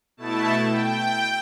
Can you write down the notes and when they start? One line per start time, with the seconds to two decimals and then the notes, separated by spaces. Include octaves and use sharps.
0.17 B2 A3 E4 A5
0.66 G5